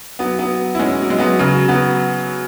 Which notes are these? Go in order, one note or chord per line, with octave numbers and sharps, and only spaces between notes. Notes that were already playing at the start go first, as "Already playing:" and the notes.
F#3 B3
F#3 B3
E4
G#3 C#4
F#3
G#3
F#3 B3
C#3 F#3
F#3 B3